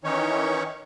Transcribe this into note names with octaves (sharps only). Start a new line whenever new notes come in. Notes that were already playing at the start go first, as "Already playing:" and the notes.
D#3 E3 C#4 D#4 C#5